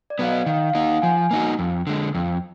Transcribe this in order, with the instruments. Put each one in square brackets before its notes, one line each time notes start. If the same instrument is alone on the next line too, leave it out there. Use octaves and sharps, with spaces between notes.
[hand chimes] D5
[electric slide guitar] F#3 B3 [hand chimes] F5
[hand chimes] D#5
[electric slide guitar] D#3 [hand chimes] F5
[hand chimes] F5
[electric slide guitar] A#3 D#4 [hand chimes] F#5
[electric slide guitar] F3 [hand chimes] G#5
[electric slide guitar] A#3 D#4 F#4
F2
D3 G#3
F2